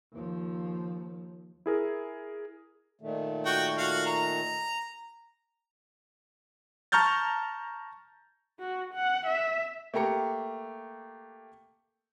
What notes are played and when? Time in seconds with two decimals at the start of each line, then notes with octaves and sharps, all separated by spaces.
0.13 D#2 F3
1.66 E4 G#4 A#4
3.01 A#2 D#3 A3
3.46 F#4 G5
3.78 F#4 F5
4.07 A#5
6.92 A5 A#5 C#6 F6 G6 A6
8.59 F#4
8.94 F#5
9.27 E5
9.94 A3 A#3 G4 A#5 C#7